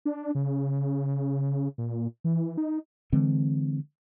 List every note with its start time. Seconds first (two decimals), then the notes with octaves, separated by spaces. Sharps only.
0.05 D4
0.35 C#3
1.78 A#2
2.24 E3
2.57 D#4
3.12 D3 E3 G#3 C4